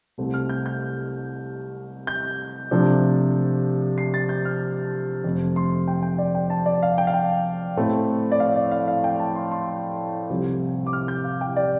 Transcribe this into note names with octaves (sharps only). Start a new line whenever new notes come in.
C2 C3 A3 C4
F6
G6
G6
G6
C3 F3 A3 D4
C7
A6
G6
F6
F2 C3 A3 C4
C6
G5
G5
D5
G5
A5
D5
F5
G5
F5
G5
A2 A3 C4
D5
F5
D5
F5
F5
G5
A5
C6
C6
C2 C3 F3 C4
D6
F6
G6
F5
G5
D5